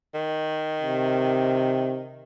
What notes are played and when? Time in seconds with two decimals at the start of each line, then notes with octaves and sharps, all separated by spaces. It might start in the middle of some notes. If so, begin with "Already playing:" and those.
0.14 D#3
0.83 C3